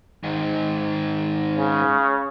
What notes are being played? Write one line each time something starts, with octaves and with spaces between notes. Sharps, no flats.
G#2 D#3
C#3